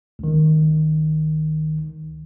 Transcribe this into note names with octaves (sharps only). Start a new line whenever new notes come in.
C#2 D#3